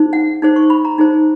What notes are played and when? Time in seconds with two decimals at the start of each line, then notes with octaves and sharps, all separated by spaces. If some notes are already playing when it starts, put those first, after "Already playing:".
Already playing: D#4 G#4 C5
0.13 F#5
0.42 D#4 G#4 C5
0.56 C#6
0.70 B5
0.85 A#5
0.98 D#4 G#4 C5